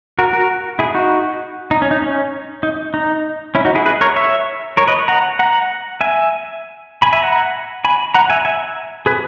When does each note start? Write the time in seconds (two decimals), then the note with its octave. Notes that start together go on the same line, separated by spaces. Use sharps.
0.19 F#4 A#4
0.33 F#4 A#4
0.79 E4 G#4
0.94 D#4 F#4
1.71 D#4
1.82 C#4
1.91 D#4
2.02 C#4
2.63 D#4
2.94 D#4
3.55 C#4 E4
3.65 D#4 F#4
3.75 E4 G#4
3.86 G#4 B4
4.01 A#4 C#5
4.16 C#5 E5
4.77 A#4 C#5
4.87 B4 D#5
5.08 F#5 A#5
5.39 F#5 A#5
6.01 E5 G#5
7.02 G#5 B5
7.13 E5 G#5
7.22 F#5 A#5
7.85 G#5 B5
8.14 F#5 A#5
8.30 E5 G#5
8.45 E5 G#5
9.06 G#4 B4